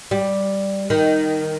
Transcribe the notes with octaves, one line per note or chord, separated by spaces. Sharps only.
G3
D#3